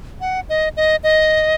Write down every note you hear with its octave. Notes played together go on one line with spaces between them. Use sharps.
F#5
D#5
D#5
D#5